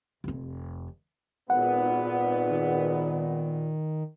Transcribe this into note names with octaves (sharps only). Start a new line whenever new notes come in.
F1 F2
G#1 A#2 B3 F#5
D#3
D#3